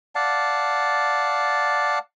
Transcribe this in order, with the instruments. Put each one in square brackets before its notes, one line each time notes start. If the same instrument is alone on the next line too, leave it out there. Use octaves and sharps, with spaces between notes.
[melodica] D5 F5 F#5 A5